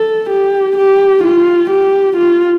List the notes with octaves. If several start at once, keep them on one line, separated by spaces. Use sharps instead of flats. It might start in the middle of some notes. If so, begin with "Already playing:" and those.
Already playing: A4
G4
G4
F4
G4
F4